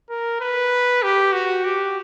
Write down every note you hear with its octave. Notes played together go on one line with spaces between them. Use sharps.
A#4
B4
G4
F#4
G4